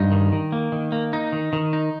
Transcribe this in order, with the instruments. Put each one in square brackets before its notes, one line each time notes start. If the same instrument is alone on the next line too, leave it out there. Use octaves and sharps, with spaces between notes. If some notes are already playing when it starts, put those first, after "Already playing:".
Already playing: [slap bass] G2 [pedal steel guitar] D#4
[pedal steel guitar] D#3
D#3
A#3
D#3
A#3
D#4
D#3
D#3
D#4